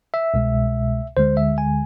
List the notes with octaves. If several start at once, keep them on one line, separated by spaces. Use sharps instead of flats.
E5
C2 B2 G#3
D2 D3 G#3 C5
E5
G#5